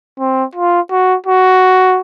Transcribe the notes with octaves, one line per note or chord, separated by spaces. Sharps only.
C4
F4
F#4
F#4